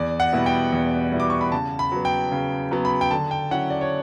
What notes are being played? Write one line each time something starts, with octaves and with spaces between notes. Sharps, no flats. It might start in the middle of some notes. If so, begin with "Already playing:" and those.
Already playing: E2 D5
F#5
B2 G3 B3 E4
G5
E2
B2 G3 B3 E4
D6
C#6
B5
C#3 A5
B5
F#3 B3
G5
C#3
F#3 B3
B5
G5
D3 A5
G5
F#3 C#4 E4 F#5
D5
C#5